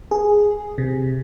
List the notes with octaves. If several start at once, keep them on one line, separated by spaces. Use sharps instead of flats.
G#4
C3